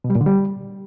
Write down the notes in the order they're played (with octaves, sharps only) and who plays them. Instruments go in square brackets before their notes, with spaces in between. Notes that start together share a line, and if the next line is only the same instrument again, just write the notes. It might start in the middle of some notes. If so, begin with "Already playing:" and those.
[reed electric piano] B2
G3
A#2
D3
G3